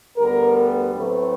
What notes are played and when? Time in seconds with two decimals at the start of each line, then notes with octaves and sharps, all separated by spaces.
0.17 D2 D3 G3 B3 A#4
0.56 B4
0.94 A2 F#3 A3 C4 B4